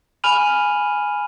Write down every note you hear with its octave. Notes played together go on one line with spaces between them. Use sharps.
G#5 B5 F6 D#7 F7 F#7